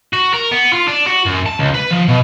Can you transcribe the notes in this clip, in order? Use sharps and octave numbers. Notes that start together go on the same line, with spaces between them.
F#4
A#4
B3
F4
D4
F#4
F#2
A5
C#2
B4
F3
B2